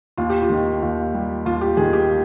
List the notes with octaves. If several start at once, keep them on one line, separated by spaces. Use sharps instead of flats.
D#2 F4
G4
F4
D#3
D#2
G3
D#2 F4
G4
D#3 G#4
G4